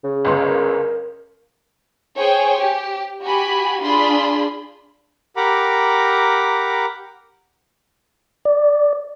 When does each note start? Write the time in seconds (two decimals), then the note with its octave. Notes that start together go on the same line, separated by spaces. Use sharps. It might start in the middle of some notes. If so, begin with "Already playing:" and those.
0.04 C#3
0.25 G1 C#2 C6
0.47 A#4
2.17 G#4 C5 C#5 G5 G#5
2.60 G4
3.22 F#4 G4 G#5 B5
3.83 D4 F4 G#4 B5 C6
5.36 G4 A#4 F#5 A#5 B5 D6
8.45 D5